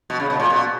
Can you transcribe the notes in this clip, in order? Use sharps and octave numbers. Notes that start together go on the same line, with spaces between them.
B2
C#3
B2
A#2
B2